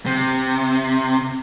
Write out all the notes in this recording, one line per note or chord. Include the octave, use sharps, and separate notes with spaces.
C3